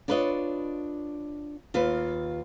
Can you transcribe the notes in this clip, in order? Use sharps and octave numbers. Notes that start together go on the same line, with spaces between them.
D4 F4 B4 C#5 D#5
D#2 F4 B4